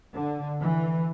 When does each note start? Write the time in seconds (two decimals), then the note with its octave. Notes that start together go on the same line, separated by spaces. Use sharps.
0.14 D3
0.60 E3